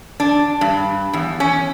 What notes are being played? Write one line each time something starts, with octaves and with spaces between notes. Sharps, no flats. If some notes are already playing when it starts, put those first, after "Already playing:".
D4
G2
E2
C#4